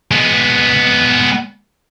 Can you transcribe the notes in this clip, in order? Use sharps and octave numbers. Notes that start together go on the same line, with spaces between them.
G#3 B3